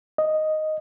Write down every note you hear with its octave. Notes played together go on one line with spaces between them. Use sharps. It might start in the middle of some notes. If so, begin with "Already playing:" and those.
D#5